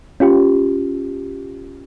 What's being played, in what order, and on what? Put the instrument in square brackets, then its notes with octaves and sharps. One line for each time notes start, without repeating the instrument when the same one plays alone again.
[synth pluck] C#4 F4 G4